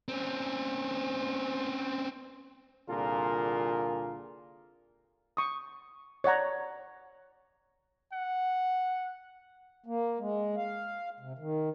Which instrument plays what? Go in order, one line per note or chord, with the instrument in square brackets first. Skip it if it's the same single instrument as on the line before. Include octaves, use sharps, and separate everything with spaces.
[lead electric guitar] C4 C#4
[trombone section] C2 A#2 D3 F4 G#4 A#4
[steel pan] C#6 D#6
C#5 D5 F#5 A#5
[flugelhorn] F#5
[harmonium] A#3
G#3
F5
C3
D#3